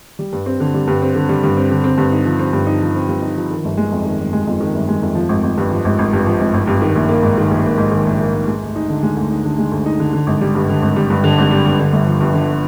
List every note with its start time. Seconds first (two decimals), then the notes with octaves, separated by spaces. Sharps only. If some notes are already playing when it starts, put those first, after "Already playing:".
0.19 G3
0.33 G2
0.46 C4
0.60 D3
0.74 G3
0.87 G2
1.02 C4
1.15 D3
1.29 G3
1.44 G2
1.57 C4
1.70 D3
1.84 C4
1.98 G2
2.12 D#4
2.25 F3
2.39 C4
2.53 G2
2.67 D#4
2.81 F3
2.95 C4
3.09 G2
3.22 D#4
3.36 F3
3.51 D#3
3.65 G1
3.77 G#3
3.92 F2
4.05 D#3
4.20 G1
4.33 G#3
4.47 F2
4.60 D#3
4.74 G1
4.88 G#3
5.02 F2
5.15 F3
5.29 G#1
5.43 G#1
5.58 G2
5.71 F3
5.85 G#1
5.99 G#1
6.13 G2
6.27 F3
6.40 G#1
6.54 G#1
6.67 G2
6.82 D#3
6.95 A#1
7.09 A#3
7.23 G#2
7.38 D#3
7.51 A#1
7.65 A#3
7.78 G#2
7.92 D#3
8.06 A#1
8.20 A#3
8.34 G#2
8.48 G#3
8.62 D2
8.76 D#4
8.89 D3
9.03 G#3
9.17 D2
9.31 D#4
9.45 D3
9.58 G#3
9.72 D2
9.86 D#4
10.00 D3
10.13 D3
10.27 G#1
10.41 G3
10.55 G2
10.69 D3
10.82 G#1
10.96 G3
11.10 G2
11.24 D3
11.38 G#1
11.51 G3
11.66 G2
11.79 D3
11.93 G1
12.07 F3
12.21 G2
12.34 D3